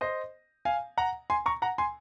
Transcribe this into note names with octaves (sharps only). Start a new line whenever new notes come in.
C5 D#5
F5 G#5
F#5 A#5
G#5 C6
A#5 C#6
F#5 A#5
G#5 C6